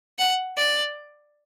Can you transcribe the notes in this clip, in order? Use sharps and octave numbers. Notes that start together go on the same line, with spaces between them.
F#5
D5